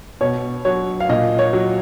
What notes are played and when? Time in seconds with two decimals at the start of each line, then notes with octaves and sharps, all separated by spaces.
0.21 B2 C#5
0.65 F#3 C#5
1.00 F5
1.09 A#2 D#5
1.39 C#5
1.53 F#3